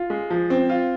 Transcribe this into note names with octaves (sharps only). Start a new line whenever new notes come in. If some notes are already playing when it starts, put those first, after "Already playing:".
Already playing: F4
G#3
F3
C4
F4